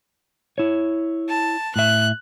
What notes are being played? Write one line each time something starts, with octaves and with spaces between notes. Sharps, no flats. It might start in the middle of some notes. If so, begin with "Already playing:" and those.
E4 C#5
A5
A2 E5 F#6